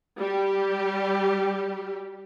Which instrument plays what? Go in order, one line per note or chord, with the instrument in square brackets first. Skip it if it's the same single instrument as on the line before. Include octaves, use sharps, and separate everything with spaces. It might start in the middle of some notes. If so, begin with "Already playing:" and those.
[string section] G3 G4